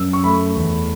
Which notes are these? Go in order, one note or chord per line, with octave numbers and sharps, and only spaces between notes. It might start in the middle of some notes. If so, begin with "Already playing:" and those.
Already playing: F#2 E6
C#6
A3 B5
E2